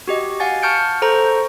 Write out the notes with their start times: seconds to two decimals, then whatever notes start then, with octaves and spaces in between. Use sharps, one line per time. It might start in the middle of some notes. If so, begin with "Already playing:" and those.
0.07 F#4 G4 D#5
0.40 F5 F#5 G#5 A6
0.62 A5 C#6 F6 G6 C#7 D7
1.02 A4 C5 A#5 C#6